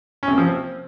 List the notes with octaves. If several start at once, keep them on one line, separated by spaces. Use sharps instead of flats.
C#4
C3
A#3
F3
C4